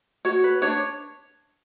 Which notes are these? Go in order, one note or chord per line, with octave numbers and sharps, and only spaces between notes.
F#4 C#5
B4
D4 C#5